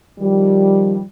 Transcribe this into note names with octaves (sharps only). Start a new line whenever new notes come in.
D#3 F3 G3